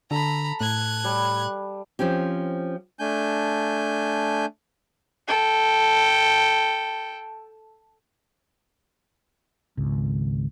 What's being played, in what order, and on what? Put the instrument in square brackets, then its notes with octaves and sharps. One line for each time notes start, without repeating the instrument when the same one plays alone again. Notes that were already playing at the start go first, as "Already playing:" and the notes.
[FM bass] D3 [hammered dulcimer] A4 [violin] A#5 B5
[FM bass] A2 [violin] F#6 G#6
[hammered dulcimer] G3
[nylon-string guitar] F3 C4 C#4 G4
[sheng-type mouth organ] A3 D4 G#5 G6
[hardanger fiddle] A4 G5
[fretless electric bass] G#1 C#2